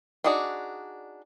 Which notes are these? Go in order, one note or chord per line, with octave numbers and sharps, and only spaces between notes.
D4 D#4 F#4 G#4 D5